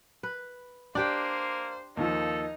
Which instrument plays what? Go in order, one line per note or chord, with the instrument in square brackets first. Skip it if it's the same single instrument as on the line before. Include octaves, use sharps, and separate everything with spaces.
[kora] B4
[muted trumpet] A#3 [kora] D4 G4 G5 [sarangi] C5 [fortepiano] D5
[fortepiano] D#2 D#3 F3 [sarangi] D#4 [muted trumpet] A4